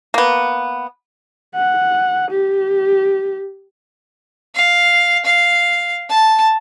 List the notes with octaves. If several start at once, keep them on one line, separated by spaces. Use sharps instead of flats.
A#3 B3
F#5
G4
F5
F5
A5